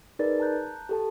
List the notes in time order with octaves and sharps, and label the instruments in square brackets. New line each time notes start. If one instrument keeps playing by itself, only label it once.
[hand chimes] D#4 G#4 A#4 B4 D5 A6
A5 A#5 F#6 G6
G4 A4 A5